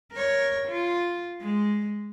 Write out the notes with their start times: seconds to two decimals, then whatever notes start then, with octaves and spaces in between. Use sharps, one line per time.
0.13 A#4 C#5
0.68 F4
1.41 G#3